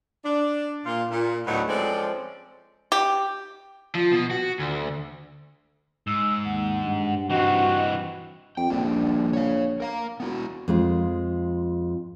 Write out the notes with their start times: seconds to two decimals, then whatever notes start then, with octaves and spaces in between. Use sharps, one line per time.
0.25 D4
0.86 A#2 F4
1.11 A#2
1.47 D2 A2 F#3 B3 D#4
1.68 F3 G#3 C4 C#4 A4 D5
2.92 G4
3.95 F3
4.12 B2
4.31 F#4
4.59 D2
6.07 G#2 E6
6.44 D#2 F#5
6.83 G2
7.30 E3 C4 F#4 D#5
8.57 F2 G5
8.70 A#1 F3 G3 D4
9.33 C#5 F5
9.80 A#4 F5 A#5
10.20 B3 E4 F#4
10.68 F2 G#3 F4